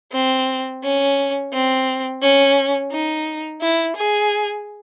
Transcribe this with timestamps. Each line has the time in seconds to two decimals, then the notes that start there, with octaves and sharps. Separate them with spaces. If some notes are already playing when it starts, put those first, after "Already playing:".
0.12 C4
0.83 C#4
1.53 C4
2.21 C#4
2.91 D#4
3.61 E4
3.96 G#4